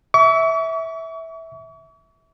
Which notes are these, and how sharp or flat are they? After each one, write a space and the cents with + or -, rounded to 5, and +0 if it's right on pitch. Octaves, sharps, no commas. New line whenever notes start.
E5 -15 C#6 +45